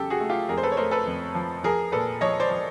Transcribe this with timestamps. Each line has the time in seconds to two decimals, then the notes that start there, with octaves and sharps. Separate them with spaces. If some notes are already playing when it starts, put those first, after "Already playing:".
Already playing: E2 C#3 F#3 G4 A4
0.10 F#4 G#4
0.20 A3
0.30 F4 G4
0.48 F2 G#4 A#4
0.58 C5
0.63 A4 B4
0.72 C#5
0.77 A3 A#4 C5
0.91 A4 B4
1.06 F2
1.35 F3
1.63 F3 G#4 A#4
1.92 A#2 A4 B4
2.21 F3 C#5 D#5
2.40 C5 D5
2.50 F3